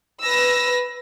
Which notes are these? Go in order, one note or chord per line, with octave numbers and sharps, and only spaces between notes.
B4 E6 A#6